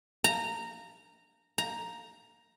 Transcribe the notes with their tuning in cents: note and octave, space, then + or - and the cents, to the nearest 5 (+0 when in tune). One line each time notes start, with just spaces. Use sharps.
A#5 -15
A#5 +5